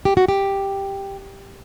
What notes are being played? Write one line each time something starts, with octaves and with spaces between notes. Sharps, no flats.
G4
F#4
G4